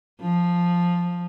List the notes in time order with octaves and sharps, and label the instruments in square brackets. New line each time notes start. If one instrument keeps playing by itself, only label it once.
[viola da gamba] F3